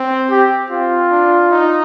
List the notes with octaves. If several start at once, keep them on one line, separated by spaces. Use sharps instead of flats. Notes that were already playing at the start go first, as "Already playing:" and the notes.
Already playing: C4
G4
C4 F4
D4
D#4